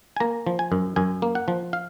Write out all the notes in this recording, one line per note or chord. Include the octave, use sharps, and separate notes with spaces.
G#5
A#3 A#5
F3
G#5
F#2
F#2 G#5
A#3
F#5
F3
F5